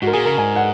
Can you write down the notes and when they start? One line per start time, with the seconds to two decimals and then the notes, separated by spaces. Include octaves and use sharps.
0.02 G#2 F#4
0.07 A#4
0.13 A#2 G#4
0.25 C#3 A#4
0.38 G#2 G#5
0.56 F#5